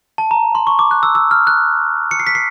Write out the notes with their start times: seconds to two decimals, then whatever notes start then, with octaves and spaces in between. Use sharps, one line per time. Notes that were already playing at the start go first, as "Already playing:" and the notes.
0.18 A5
0.31 A#5
0.55 C6
0.67 C#6
0.79 D6
0.91 F#6
1.03 E6
1.15 E6
1.31 F6
1.47 F#6
2.11 C#7
2.20 C7
2.27 B6
2.35 C7